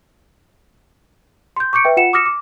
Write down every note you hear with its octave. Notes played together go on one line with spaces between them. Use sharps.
C6 G6
C#6 D6 G6 C#7 D7
B4 E5 G5
F4 F#5 C#7 E7
D6 D#6 F6 A#6 C#7 E7
D6